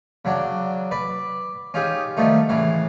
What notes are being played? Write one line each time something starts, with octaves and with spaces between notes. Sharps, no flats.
C#3 F#3 D4
B4 D5
C#4 D#4 F4 G4 G#4
D#3 F3 G3 A3 D#4
A2 C#3 E3 F5